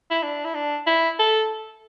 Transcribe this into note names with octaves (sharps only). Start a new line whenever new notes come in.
E4
D4
E4
D4
E4
A4